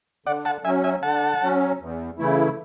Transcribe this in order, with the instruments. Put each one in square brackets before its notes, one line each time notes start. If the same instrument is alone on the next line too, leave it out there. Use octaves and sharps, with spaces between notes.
[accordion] D3 [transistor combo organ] D5 F#5
[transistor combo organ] F#5 A5
[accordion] F#3 C#4 [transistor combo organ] E5 G#5
[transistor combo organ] E5 G#5
[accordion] D3 [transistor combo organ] F#5 A5
[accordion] F#3 C#4
E2
C#3 E3 A3 E4